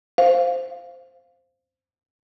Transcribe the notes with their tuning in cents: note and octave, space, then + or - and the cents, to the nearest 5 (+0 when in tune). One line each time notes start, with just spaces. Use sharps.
C5 +0 F5 +0